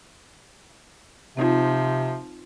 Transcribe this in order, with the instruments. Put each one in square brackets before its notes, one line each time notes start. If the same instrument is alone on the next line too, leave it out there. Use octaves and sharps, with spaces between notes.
[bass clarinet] C3 [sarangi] F3 [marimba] C4 D#4 F4